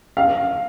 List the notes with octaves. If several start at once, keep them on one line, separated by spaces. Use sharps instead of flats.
F5